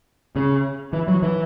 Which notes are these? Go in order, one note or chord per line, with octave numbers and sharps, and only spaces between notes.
C#3
E3
F#3
E3